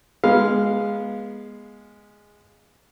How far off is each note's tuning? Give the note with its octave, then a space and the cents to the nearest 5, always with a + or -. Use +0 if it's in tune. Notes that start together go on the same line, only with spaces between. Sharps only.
G#3 -5 B3 -25 F5 +0